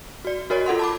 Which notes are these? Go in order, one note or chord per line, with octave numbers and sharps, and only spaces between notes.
F#4 D5
F#4 A#4 C#5 D#5
F4 A4 F#5 C6
A5 B5 D6